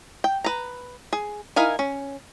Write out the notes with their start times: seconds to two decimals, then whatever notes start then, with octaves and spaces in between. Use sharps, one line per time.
0.24 G5
0.44 B4 A#5
1.13 G#4
1.56 D#4 E4 A#4 F5 G#5
1.79 C#4